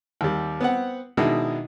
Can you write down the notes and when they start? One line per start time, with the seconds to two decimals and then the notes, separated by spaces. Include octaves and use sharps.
0.21 D#2 G3
0.61 B3 C4 F#5
1.17 B2 D#3 G#3 D4 E4